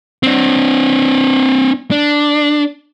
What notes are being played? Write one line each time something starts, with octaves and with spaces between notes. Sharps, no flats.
C4 D4
D4